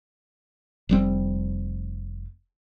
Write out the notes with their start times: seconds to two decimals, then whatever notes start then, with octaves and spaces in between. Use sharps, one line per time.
0.89 F1 G3 C4